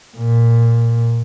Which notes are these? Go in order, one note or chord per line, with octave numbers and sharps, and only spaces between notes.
A#2